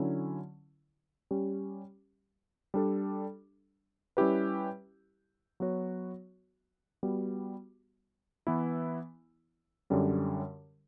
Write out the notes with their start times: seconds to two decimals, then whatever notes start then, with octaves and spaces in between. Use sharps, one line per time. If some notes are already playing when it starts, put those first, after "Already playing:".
Already playing: D3 F#3 C#4 E4
1.31 G3 C#4 G4
2.74 G3 D4 A4
4.17 G3 C#4 E4 G4 B4
5.60 F#3 B3 F#4 C#5
7.03 G3 B3 F#4
8.47 E3 B3 E4
9.90 F#2 D3 G3 C#4